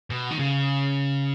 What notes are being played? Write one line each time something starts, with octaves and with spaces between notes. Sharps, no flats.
B2
D#3
C#3